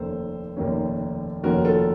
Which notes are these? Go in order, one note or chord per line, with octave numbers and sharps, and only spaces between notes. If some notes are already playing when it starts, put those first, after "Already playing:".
Already playing: F1 D#2 D#3 A#3 C#4 A4 C5
F1 D#2 D#3 A#3 C#4
F1 D#2 D#3 A#3 C#4 F#4 A#4
F4 A4